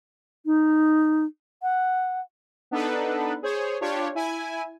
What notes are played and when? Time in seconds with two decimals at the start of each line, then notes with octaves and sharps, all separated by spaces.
0.46 D#4
1.62 F#5
2.71 B3 D4 D#4 A4 B4
3.42 G#4 C5 C#5
3.81 D4 F4 G4 C#5
4.15 E4 G#5